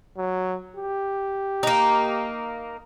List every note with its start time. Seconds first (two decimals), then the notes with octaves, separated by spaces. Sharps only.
0.17 F#3
0.76 G4
1.63 A#3 D#4